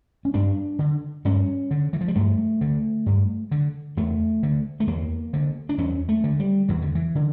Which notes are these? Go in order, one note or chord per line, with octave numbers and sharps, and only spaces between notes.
C#4
G2 D4
D3
G2 C#4
D3
E3
F3
G3
G2 A3
D3
G2
D3
E2 A3
D3
A3
E2 A#3
D3
D4
E2 C#4
A3
D3
G3
E2 E3
D3
E3
D3